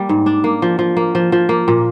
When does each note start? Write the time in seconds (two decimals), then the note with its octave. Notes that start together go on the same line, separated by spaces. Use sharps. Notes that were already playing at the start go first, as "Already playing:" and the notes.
Already playing: G3 A#3
0.09 G#2
0.26 D4
0.44 A#3
0.62 F3
0.79 F3
0.97 A#3
1.15 F3
1.32 F3
1.49 A#3
1.68 A#2